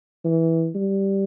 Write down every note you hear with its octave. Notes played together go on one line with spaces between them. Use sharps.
E3
G3